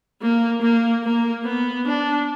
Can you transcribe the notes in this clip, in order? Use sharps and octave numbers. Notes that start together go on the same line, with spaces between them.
A#3
A#3
A#3
B3
D4